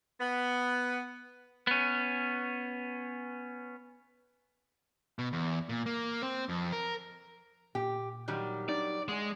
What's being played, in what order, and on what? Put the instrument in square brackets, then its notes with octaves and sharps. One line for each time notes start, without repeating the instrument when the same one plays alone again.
[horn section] B3
[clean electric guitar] B3 C#4
[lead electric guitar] B2
E2
A#2
A#3
C4
F2
A#4
[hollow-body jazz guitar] A#2 [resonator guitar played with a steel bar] G4
[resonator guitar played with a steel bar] D#3 F#3 G3
[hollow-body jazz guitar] D4 D#4 [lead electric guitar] D5
[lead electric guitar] G#3 [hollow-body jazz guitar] F#5 G#5